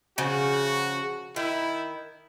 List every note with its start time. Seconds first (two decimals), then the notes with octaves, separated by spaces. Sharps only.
0.18 C#3 F3 F#4
1.36 D#3 E4